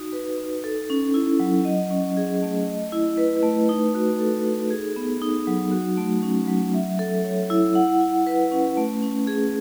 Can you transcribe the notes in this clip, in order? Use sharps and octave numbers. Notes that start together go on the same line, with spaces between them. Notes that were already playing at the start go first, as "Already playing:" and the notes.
Already playing: D#4 F#4
B4
D#4
A4
C#4
E4
F#3
D#5
C#4
G#4
A3
D#5
E4
B4
A3
D#4
F#4
A4
D#4
G#4
B3
D#4
F#3
F#4
A3
C#4
F#3
E5
A4
C#5
E4
F#5
E4
B4
C#4
A3
C#4
G#4